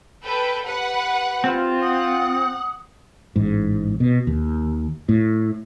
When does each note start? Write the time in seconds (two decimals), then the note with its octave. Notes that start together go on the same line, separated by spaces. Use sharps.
0.23 A4 B4 G5
0.65 G4 B4 F#5
1.44 C4 F4
1.81 F#5 D#6
3.36 A1 G#2
4.00 B2
4.27 D#2
5.09 A2